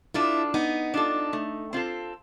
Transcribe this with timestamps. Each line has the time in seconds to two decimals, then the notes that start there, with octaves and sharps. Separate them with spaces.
0.14 D4 E4 F4 A4
0.54 B3 D#4
0.94 D4 F4 A4
1.33 A3
1.73 C4 F4 A4